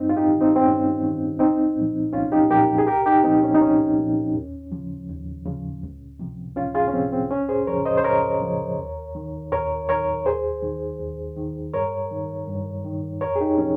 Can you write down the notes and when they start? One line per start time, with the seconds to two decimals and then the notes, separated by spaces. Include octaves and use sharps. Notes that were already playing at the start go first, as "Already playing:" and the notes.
Already playing: G2 C4 D#4
0.09 F4
0.16 D#4 G4
0.28 D#3
0.41 C4 D#4
0.56 C4
0.65 G2 C#4
1.02 D#3
1.39 C2 C4 D#4
1.76 A#2 F3
2.13 C2 C#4 F4
2.32 D#4 G4
2.50 A#2 F3 G4 A#4
2.78 G#4
2.87 C2 G4 A#4
3.06 D#4 G4
3.24 A#2 F3 C4 D#4
3.43 C#4
3.55 D#4
3.61 C2 C#4
3.98 A#2 F3
4.34 D#2
4.72 C#3 F3
5.09 D#2
5.46 C#3 F3
5.83 C#2
6.19 C3 F3
6.56 C#2 C#4 F4
6.74 F4 G#4
6.88 C#4
6.93 C3 F3 C4
7.12 C4
7.30 C#2 C#4
7.49 G#4 C5
7.67 C#3 F3 A#4 C#5
7.85 C5 D#5
7.97 C5
8.04 C#2 A#4 C#5
8.41 C#3 F3
8.78 D#2
9.15 D#3
9.52 D#2 A#4 C#5
9.89 D#3 A#4 C#5
10.26 D#2 G#4 C5
10.62 D#3
11.00 D#2
11.37 D#3
11.73 G2 A#4 C#5
12.11 D#3
12.47 G2
12.85 D#3
13.21 F2 A#4 C#5
13.36 G#4
13.40 D#4 G4
13.58 C3 F3 C#4